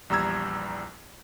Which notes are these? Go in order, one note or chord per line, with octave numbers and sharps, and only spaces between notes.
A#1 E2 G3 A#5 E6 G#6